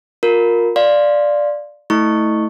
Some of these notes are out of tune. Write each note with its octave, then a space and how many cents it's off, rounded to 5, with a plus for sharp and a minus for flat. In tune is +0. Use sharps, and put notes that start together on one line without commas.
F4 +30 A#4 +0
D5 +0 F5 +0 C6 +0
A3 +0 E4 -30 C#6 +0